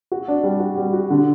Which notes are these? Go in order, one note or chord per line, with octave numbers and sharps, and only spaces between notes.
F#4
D4
G3
F#4
G3
F#4
D3